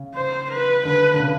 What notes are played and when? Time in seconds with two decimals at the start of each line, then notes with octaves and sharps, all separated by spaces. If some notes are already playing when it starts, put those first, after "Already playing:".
Already playing: C#3
0.15 C5
0.50 B4
0.85 D3 B4
1.14 D3
1.20 C#3